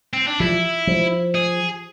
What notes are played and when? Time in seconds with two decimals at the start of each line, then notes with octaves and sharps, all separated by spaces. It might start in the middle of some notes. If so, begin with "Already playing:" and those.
0.14 C4
0.28 D4
0.40 F3 E4
0.87 F3
1.35 G#4